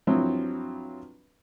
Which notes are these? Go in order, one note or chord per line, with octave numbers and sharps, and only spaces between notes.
G2 F3 F#3 C4 E4